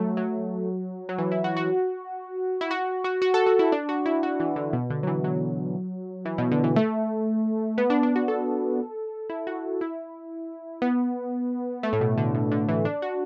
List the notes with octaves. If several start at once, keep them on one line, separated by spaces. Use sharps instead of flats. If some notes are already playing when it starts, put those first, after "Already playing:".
Already playing: F#3 A3
F#3
F#3
E3
E4
F#4
F#4
E4
F#4
F#4
F#4
A4
F#4
E4
D4
F#4
E4
F#4
E3
D3
B2
D3
F#3
E3
F#3
E3
B2
D3
E3
A3
B3
D4
D4
F#4
A4
E4
F#4
E4
B3
A3
A2
B2
D3
B2
D3
E3
D4
F#4